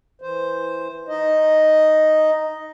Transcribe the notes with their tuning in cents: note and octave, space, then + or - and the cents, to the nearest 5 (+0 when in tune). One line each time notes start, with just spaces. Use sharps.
E3 +0 C5 +0
D#4 +0 D#5 +0